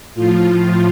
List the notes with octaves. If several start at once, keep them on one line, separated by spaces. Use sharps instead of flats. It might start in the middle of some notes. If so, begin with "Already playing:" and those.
A2 F3 F4
F4